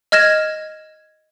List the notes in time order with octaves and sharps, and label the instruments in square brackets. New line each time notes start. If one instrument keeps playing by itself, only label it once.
[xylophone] D#5 F6 G#6 A#6 E7